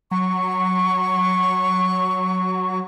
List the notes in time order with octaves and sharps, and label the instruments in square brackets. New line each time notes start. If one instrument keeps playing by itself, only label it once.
[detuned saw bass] F#3 [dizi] C#6